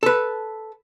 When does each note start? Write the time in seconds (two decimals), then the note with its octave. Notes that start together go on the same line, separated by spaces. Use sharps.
0.03 A4 B4